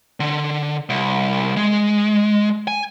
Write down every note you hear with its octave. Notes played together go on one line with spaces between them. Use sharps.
D3
C2
G#3
G#5